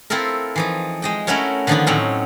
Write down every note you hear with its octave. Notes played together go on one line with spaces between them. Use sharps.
C4 E4 F4 A4 A#4
E3 F3 D#4
G#3 D#5 G5
A3 C#4 E4 F#4 A#4 C#5
D3 D#3 F3 B3 D4 D#4
A2 F#3 C4 C#4 F#5 A#5